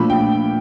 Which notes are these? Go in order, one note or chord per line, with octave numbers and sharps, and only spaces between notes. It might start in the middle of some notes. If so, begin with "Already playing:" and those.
Already playing: A#2 F3 A3 D4 B5
G5